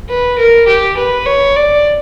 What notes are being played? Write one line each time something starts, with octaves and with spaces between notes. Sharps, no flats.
B4
A#4
G4
B4
C#5
D5